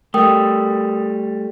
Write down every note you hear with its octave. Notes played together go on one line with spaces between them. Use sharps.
G3 A3 A#4 G5 D#6